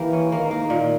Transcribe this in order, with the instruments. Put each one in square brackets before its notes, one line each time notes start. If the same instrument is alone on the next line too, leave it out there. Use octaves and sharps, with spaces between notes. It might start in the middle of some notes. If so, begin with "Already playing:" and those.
Already playing: [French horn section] E3 [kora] A#3 G4
[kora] C#4
[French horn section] D#3 [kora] A#3
[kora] A#3
A#2